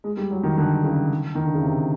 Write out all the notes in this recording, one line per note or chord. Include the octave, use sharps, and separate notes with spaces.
G#3
G3
F#3
D#3
D3
C#3
D#3
D3
C#3
C3